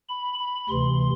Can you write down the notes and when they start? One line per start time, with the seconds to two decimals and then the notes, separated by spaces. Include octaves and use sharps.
0.09 B5
0.39 B5
0.69 D2 C3 E3 C6